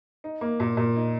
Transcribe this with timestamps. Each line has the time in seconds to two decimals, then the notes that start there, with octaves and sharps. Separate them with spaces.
0.24 D#4
0.41 A#3
0.60 A#2
0.77 A#2
0.96 D#4